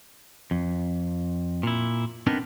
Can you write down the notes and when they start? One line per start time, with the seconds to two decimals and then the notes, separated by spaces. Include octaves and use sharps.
0.51 F2
1.63 A#2 E4
2.27 B3 C4 D4 D#4 A#4 B4